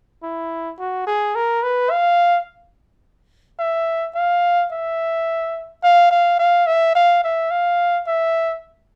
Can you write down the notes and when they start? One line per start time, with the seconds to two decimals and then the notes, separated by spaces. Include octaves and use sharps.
0.23 E4
0.79 F#4
1.07 G#4
1.35 A#4
1.63 B4
1.90 F5
3.59 E5
4.15 F5
4.72 E5
5.83 F5
6.11 F5
6.39 F5
6.67 E5
6.95 F5
7.24 E5
7.51 F5
8.07 E5